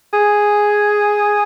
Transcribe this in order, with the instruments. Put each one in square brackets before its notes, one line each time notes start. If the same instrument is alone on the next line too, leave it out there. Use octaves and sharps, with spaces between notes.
[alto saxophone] G#4